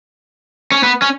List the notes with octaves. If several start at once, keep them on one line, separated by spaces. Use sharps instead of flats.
C#4
B3
C#4